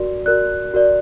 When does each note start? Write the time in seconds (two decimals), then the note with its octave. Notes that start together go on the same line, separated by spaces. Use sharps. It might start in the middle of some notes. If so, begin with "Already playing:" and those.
Already playing: F#4 A#4 D5
0.26 F#4 A#4 D5 F#6
0.74 F#4 A#4 D5